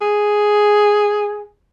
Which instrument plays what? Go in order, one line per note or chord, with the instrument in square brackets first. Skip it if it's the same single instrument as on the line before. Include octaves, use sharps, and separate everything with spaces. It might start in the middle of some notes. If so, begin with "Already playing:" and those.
[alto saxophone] G#4